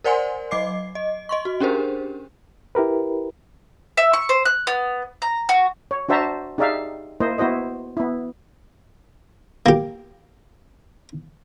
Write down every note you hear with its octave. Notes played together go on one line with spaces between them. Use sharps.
A#4 C5 D5 F#5 G#5 C6
F#3 D#5 D6 C7
D#5
D#5 C6 C#6
F#4
C#4 D4 G4 G#4 A#4 C5
E4 G4 A#4 B4
E5
C#6
C5
F#6
B3
A#5
F#4
C#5
D4 F#4 C5 E5 A5 A#5
D#4 G4 G#4 D5 E5 F5
A#3 E4 C5 D#5
B3 E4 F#4 C5 D#5
B3 E4
A#3 G4